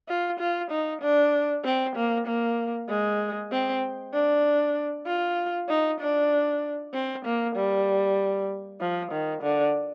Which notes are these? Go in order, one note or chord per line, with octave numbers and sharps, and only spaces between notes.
F4
F4
D#4
D4
C4
A#3
A#3
G#3
C4
D4
F4
D#4
D4
C4
A#3
G3
F3
D#3
D3